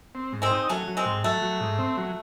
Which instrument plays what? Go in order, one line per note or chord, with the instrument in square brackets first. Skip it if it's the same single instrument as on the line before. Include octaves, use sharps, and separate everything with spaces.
[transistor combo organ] C4
G#2
[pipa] G#3 C4
[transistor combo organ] D#4
[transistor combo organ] F#3 [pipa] A3 C#4
[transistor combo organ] F#3
[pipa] G#3 C4
[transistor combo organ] G#2
[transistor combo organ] F#3 [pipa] A3
[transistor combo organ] F#3
G#2
C4
F#3